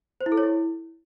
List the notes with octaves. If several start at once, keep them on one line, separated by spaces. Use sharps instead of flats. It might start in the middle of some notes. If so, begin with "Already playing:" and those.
C5
E4
A4
C#5
E4